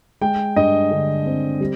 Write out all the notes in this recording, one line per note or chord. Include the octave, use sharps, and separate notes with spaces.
G#3 G5
G2 D#5
D3
C4
G3